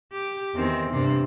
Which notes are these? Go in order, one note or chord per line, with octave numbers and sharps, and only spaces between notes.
G4
E2 D#3 C4
G2 C3